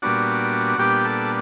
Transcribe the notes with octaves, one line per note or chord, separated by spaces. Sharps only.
A#2 G3 B3 D4 F#4
A#2 G3 B3 D4 G4
A4